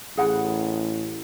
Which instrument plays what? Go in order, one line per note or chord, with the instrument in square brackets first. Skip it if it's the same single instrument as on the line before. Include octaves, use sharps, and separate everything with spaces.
[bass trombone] A1 [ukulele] G#4 F#5 B5